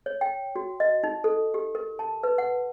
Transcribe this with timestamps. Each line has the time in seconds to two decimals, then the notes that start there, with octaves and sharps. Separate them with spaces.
0.06 C#5
0.21 G5
0.56 F#4
0.80 D#5
1.03 D#4
1.24 A4
1.54 G4
1.75 A#4
1.99 A5
2.23 B4
2.38 F#5